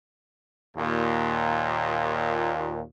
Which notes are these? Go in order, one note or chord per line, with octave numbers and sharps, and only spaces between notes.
D#2 A#2